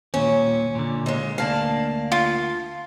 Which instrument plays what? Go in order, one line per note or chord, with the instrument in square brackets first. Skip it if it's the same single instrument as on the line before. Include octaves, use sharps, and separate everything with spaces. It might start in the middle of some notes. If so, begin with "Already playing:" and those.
[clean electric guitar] D#2 A#2 [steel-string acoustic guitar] C#4
[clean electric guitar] A#2 D3
[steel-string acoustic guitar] D#2 G#3
[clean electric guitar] D2 A#3 D4 [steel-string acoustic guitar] F5 A5
[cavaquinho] F4